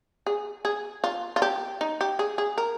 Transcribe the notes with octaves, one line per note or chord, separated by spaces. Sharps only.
G#4
G#4
F4
F4
G4
D#4
G4
G#4
G#4
A#4